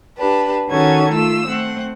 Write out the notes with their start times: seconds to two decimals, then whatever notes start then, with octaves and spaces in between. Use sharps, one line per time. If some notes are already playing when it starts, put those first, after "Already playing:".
0.17 D4 G4 B4 A5
0.70 D#3 C#4 F#4 A4 A5 G#6
1.13 A3 F4 E6
1.47 A3 C4 F#5